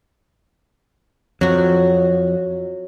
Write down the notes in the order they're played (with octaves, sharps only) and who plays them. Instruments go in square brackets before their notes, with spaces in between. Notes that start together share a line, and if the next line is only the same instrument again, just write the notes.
[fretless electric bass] F2 [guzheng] F#3 F#4